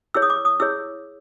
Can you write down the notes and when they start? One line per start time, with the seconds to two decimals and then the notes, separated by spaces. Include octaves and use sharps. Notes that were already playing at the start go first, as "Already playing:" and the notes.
0.14 E4 G#4 C#5 E6
0.22 D#6
0.30 D6
0.45 D#6
0.60 E4 G#4 C#5 E6